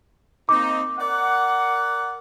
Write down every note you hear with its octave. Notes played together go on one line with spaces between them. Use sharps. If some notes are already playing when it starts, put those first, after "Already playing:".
A#3 C4 D#4 D6
A#4 D5 F#5